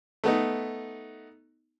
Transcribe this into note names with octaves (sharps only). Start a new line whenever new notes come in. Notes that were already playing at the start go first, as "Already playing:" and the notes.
A3 B3 D#4